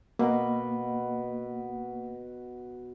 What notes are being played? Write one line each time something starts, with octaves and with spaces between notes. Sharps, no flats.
B2 A#3